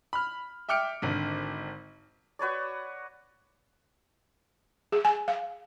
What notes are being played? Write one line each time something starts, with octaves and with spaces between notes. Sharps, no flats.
B5 F6
E5 G5 D6 F6 C#7 D7
G#1 D3
F#4 B4 C#5 D5
G#4
G#5
F5